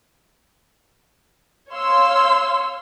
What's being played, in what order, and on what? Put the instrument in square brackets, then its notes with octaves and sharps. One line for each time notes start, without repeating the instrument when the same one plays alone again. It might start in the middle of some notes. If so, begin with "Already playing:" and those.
[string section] C#5 F5 C6 E6